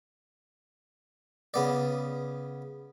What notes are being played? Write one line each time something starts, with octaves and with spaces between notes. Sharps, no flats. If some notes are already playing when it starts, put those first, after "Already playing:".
C#3 B3 D5